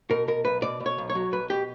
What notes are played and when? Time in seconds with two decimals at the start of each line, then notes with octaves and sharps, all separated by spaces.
0.10 B2 A#4
0.28 B2 A#4
0.45 B1 B4
0.62 B2 D5
0.80 B2
0.86 C#5
0.98 B1
1.10 C#5
1.15 F#3
1.32 B1 B4
1.50 B2 G4